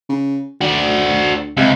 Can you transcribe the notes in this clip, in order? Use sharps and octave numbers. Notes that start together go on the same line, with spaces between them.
C#3
D2 F#4 D5
C#2 C3